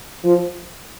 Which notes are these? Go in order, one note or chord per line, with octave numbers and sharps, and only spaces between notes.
F3